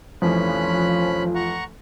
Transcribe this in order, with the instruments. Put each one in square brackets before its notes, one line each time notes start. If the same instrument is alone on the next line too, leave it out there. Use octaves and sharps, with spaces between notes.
[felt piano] F1 E3 [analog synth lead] F3 [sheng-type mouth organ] C#4 B5 F#6
[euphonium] F4
[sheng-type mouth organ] F#5 A#5 C#6